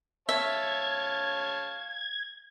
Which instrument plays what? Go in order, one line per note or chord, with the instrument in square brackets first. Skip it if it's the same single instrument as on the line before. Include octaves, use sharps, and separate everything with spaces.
[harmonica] C#5 F5 A5 [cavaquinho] E5 [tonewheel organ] G#6